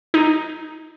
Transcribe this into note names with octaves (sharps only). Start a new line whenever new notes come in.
D#4